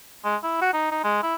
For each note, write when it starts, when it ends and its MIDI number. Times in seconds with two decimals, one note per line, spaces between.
0.24 0.36 56
0.43 0.58 64
0.61 0.72 66
0.73 0.90 63
0.91 1.01 63
1.04 1.21 56
1.23 1.35 64